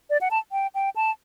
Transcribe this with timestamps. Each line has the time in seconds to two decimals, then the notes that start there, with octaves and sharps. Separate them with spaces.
0.10 D5
0.21 F#5
0.31 A5
0.52 G5
0.75 G5
0.96 A5